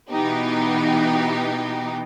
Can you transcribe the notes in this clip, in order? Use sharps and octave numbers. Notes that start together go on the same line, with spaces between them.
B2 E3 B3 D#4 G4